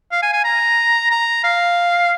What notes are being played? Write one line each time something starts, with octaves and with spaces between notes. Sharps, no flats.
F5
G#5
G#5
A#5
A#5
F5